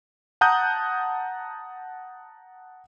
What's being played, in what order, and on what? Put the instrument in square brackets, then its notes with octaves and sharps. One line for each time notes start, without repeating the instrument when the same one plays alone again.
[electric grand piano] F#5 A5 A#5 D#6 F#6 G6